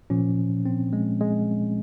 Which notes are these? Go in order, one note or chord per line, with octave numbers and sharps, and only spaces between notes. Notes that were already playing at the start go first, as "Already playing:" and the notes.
A#2 F3 C#4
C4
G#3
G#3